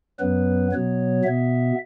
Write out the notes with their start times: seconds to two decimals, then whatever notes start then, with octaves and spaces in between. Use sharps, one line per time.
0.20 F#2 F#3 B3 B4
0.72 B2 F#3 B3 C#5
1.24 B2 B3 E5